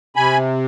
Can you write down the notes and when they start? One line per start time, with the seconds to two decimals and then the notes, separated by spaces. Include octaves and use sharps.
0.16 C3 G#5 B5